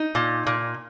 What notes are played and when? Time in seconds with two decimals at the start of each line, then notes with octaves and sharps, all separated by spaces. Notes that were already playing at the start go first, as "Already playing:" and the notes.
Already playing: D#4
0.15 A#2
0.47 A#2